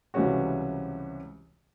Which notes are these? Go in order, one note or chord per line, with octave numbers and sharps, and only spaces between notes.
C#2 C3 E3 G3 C#4 F#4